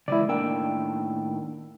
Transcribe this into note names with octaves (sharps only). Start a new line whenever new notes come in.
C#3 E3 G#3 E4 D5
A2 D#3 A#3 D4 G5 E6